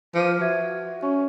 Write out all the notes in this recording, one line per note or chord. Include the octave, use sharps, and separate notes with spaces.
F3 B4 D6 D#7
F6
F#4 B4 E5 G#6
C#4 C#6